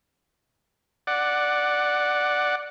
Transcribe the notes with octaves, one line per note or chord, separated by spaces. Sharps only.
D5 F#5